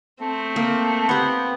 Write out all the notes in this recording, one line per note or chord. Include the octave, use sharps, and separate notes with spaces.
A3 C4
A#3
B3 G4 F#5